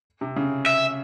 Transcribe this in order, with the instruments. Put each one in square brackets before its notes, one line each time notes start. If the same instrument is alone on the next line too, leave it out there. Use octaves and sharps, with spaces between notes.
[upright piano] C3
C#3
[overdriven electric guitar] E5